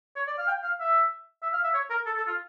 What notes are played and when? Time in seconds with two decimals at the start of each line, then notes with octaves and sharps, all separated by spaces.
0.16 C#5
0.27 D5
0.38 F5
0.48 G5
0.63 F5
0.80 E5
1.43 E5
1.53 F5
1.64 E5
1.74 C#5
1.90 A#4
2.06 A4
2.17 A4
2.27 F4